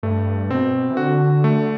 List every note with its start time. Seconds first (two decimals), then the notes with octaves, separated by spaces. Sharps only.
0.03 G2 A3
0.50 B2 C4
0.90 E3
0.97 D3 F#4
1.44 A3